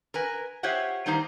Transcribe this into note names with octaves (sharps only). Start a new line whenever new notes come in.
A#4 B4 G#5
F4 G4 C5 C#5 E5 F#5
D#3 G3 A#3 D#4 C5 A#5